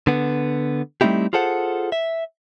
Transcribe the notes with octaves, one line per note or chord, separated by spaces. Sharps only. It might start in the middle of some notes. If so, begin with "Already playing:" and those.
D3 B3
G3 A3 C4 D#4 E4 G4
F4 G#4 A4 C5 F#5
E5